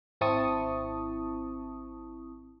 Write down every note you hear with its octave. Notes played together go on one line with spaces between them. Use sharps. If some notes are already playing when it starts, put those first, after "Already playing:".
G#1 C4 E4 A5 C#6 D#6